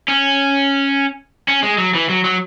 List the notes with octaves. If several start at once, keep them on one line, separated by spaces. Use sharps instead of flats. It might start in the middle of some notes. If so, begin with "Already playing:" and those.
C#4
C#4
G#3
F#3
E3
F#3
F#3